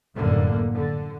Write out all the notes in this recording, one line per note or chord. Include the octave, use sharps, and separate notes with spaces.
F1 F#2 A2 D3 A#3
D3